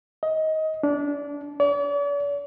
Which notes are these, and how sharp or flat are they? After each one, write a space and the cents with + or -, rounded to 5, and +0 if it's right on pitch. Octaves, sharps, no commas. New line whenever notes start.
D#5 +20
D4 -25
D5 -45